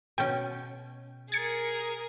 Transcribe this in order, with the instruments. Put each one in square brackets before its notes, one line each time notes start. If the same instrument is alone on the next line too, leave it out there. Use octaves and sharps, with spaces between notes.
[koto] B2 C#4 [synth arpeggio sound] G5 G6
[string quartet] G#4 A#4 [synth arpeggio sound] G#6 A6 C#7